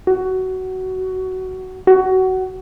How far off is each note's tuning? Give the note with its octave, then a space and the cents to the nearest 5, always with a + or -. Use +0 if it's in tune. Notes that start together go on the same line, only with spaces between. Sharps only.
F#4 +15
F#4 +20